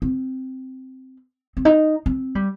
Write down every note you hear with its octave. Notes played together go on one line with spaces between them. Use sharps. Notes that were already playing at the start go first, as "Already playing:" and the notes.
C4
C4
D#4
C4
G3